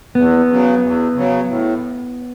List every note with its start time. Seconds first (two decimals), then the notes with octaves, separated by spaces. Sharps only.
0.15 E2 B3
0.49 C#3 F#3
0.82 E2
1.14 C#3 F#3
1.47 A2